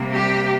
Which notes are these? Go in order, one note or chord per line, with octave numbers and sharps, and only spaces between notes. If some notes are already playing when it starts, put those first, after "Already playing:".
Already playing: C3 G3 A#3
G4